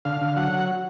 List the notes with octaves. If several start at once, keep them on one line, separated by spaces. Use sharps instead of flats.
D3 F5
D3
F#3 F#5